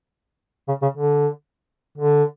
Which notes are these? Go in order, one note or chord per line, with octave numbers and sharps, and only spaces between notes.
C#3
C#3
D3
D3